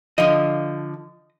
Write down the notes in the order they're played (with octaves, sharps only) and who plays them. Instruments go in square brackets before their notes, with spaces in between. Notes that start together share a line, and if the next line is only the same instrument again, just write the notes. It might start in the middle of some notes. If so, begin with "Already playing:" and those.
[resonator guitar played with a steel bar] D3 F3 [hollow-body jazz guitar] D#5